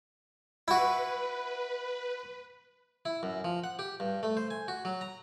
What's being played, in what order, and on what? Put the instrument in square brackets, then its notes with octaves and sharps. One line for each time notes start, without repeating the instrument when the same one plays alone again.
[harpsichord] E4 F#4 [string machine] B4
[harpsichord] E4
F#2
F3
F#5
G4
G2
A3
C5
G#5
F#4
F#3
A#5